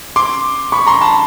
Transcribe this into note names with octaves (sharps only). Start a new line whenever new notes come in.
C6 D6
B5 C#6
A#5 C6
A5 B5